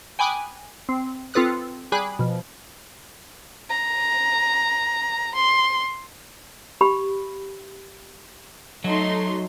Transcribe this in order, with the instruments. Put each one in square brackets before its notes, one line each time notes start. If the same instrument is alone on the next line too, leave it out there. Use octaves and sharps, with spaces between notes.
[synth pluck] G5 G#5 B5 D6 D#6 F#6
C4
C4 F4 A4 B4 D#6 F#6
G3 G#4 G#5 B5 D6 F#6
B2 F3
[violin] A#5
C6
[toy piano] G4 B5
[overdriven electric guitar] F#3 [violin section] A3 D#4 C6